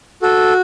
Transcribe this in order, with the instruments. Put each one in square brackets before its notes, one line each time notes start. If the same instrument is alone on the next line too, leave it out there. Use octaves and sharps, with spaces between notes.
[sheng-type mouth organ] F#4 A4